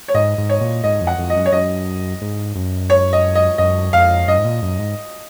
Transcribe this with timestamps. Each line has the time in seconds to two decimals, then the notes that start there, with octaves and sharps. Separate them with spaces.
0.08 C#5
0.14 G#2 D#5
0.38 G#2
0.49 C#5
0.61 A#2
0.84 G#2 D#5
1.01 F2
1.07 F#5
1.18 F2
1.30 D#5
1.36 F#2
1.46 C#5
1.52 F#2 D#5
2.22 G#2
2.55 F#2
2.90 C#5
3.13 D#5
3.35 D#5
3.58 F#2 D#5
3.93 F2 F5
4.27 F#2 D#5
4.38 G#2
4.45 A#2
4.62 F#2
4.79 G#2